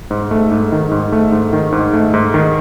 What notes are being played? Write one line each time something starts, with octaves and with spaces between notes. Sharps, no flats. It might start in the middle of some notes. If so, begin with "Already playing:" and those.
G#2
A3
G#2
D#3
G#2
A3
G#2
D#3
G#2
A3
G#2
D#3